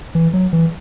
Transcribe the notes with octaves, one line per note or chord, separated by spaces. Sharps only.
E3
F#3
E3